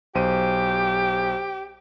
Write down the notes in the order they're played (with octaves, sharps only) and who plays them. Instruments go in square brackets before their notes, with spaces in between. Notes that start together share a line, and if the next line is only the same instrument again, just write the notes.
[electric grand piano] B1 C5 D#7 [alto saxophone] G4